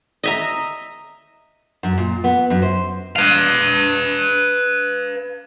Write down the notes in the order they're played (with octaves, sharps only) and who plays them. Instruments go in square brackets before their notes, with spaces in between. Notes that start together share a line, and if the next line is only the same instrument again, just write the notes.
[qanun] D#5 E5 A#5
[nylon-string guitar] F#2
A#2
B3
F#2
C5
[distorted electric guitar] B4 F5